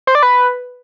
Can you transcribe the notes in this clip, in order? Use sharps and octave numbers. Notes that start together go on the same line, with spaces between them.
C5
D5
B4